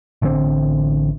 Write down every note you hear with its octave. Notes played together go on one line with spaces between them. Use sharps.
A1 D3 F#3 C4